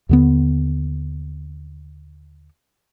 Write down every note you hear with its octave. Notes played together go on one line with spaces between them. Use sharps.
D#2 D3 B3